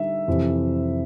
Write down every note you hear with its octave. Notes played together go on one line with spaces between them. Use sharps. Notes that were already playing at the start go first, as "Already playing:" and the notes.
Already playing: D3 G3 D#4 E5
F2 C3 E3